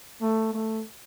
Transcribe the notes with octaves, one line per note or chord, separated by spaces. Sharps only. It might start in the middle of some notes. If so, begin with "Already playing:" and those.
A3
A3